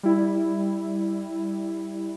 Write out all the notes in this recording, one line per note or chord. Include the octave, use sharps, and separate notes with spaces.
G3 E4